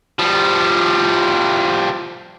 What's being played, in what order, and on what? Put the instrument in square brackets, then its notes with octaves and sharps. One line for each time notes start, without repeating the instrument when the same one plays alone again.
[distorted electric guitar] F3 G3